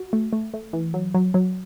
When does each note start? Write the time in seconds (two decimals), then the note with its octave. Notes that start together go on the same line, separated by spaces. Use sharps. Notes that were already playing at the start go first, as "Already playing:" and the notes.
Already playing: F#4
0.13 A3
0.33 A3
0.54 A3
0.73 E3
0.94 F#3
1.14 F#3
1.34 F#3